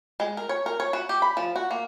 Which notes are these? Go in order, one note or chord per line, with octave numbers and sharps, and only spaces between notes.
G#3
A#4
C#5
A#4
C#5
F#4
G4
B5
F3
F#4
A#3